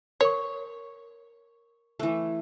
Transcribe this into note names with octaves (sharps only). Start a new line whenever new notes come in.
A#4 C#5 C#6
E3 A3